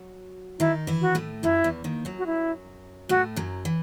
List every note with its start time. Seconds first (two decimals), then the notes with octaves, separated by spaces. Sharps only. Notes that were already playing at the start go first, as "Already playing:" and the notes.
Already playing: F#3 F#4
0.59 D#3 D#4 E4
0.87 E3 E4
1.01 F#4
1.15 A2 A3
1.43 F#2 F#3 E4
1.64 E2 E3
1.84 D#2 D#3
2.05 F#2 F#3
2.18 F#4
2.26 E4
3.09 A2 A3 F#4
3.36 F#2 F#3
3.65 E3